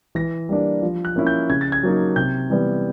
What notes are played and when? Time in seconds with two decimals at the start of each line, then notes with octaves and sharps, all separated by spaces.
0.15 E3 A#6
0.49 G3 A#3 D4
0.82 F3
1.05 F#6
1.16 A#3 C#4 E4
1.27 G6
1.50 C#3 G#6
1.61 A6
1.72 G#6
1.83 F#3 A#3 D#4
2.16 C3 G6
2.50 E3 G3 B3